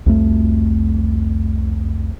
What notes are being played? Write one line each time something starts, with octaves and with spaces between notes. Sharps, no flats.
C2 F2 A3